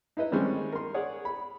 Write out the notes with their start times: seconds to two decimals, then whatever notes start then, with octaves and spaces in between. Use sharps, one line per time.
0.17 D#4 E4 B4 D#5
0.31 D3 D#3 G3 G#3 C4 C#4
0.72 A#4 C6
0.94 G#4 C#5 D5 F#5
1.25 B5